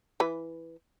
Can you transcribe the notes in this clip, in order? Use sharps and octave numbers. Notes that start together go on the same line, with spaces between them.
E3 B4